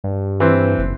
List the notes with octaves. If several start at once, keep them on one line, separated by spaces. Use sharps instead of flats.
G2
E3 C4
F#1